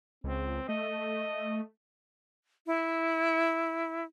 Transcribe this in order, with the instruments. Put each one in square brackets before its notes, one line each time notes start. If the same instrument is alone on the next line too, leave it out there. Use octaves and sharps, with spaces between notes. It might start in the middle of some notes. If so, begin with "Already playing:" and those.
[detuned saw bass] C#2 [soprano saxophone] C4
[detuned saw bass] A3 [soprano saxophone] D#5
[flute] E4